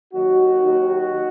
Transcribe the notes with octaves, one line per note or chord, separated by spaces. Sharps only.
D#2 D#3 F#3 D#4 F#4
D#2 D#3 F#3